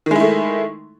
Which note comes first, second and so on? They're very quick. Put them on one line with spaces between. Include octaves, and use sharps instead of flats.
D#3 G#3 E4 A3